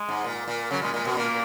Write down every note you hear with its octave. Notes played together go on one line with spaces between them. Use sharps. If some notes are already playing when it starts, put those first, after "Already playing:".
Already playing: G#3
G#2
A#2
A#2
C#3 F#3
A#2 G#3
A#2 G#3
B2 G#3
A#2 A#3